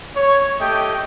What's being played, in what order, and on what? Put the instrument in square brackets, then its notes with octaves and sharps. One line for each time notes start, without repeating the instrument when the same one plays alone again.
[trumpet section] C#5
A3 G4 D#5 G5